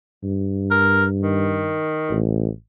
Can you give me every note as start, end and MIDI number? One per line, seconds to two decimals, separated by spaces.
0.23 1.82 43
0.71 1.04 70
1.22 2.17 51
2.10 2.49 33